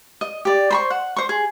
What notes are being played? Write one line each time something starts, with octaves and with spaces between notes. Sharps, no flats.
D#5
G4 D5
C5 B5 C#6
F#5
C5 C#6
G#4